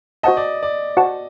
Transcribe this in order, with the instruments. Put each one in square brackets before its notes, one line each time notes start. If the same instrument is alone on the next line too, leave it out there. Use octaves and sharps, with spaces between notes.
[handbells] F#4 C5 F#5 A5 [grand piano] D#5
[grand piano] D5
D5
[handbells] F#4 C5 F#5 A5